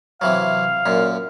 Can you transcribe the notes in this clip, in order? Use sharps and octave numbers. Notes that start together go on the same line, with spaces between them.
C3 E3 F#3 F5
F#2 A#2